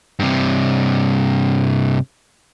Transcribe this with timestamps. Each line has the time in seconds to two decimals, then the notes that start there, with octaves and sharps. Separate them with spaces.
0.19 G2 C3